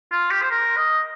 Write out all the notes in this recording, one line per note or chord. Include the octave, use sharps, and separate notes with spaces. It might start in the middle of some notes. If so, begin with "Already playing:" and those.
F4
G4
C5
A#4
D#5